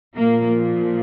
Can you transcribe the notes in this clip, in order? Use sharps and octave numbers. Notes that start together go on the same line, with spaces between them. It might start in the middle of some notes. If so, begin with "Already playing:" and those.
A#2 F3 A#3